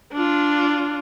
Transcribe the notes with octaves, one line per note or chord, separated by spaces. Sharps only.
D4 F4